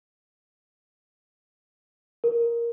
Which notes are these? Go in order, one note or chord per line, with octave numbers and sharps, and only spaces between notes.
A#4